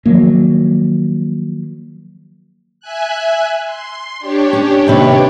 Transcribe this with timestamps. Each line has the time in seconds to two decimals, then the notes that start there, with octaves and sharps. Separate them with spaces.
0.06 D#3 F3 F#3 A#3
2.80 E5 G#5 F#6
3.66 C6
4.19 D4 G4 C#5
4.53 C#4
4.87 D#2 C3 B4